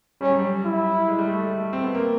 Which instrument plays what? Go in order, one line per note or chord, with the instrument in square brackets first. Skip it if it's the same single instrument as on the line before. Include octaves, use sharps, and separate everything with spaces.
[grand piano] G3 [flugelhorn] C#4
[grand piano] F#3
G3
[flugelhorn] E4
[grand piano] G#3
G3
A3
A3
C4
B3
A#3